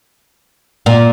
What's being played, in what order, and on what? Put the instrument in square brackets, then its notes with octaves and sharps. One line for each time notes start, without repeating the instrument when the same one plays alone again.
[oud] A#2